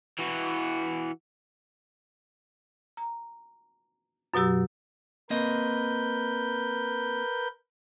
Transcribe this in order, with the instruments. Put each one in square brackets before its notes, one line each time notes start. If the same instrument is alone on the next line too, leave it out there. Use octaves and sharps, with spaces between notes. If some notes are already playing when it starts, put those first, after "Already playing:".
[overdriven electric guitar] E3 F#4
[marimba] A#5
F#2 B2 F#3 G4 E6
[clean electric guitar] A#3 C4 D#5 [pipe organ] A#4 B4 G6